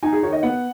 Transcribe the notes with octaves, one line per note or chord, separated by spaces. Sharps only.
D#4 G#5
G#4
D#3 C#5
D#5
B3 F#5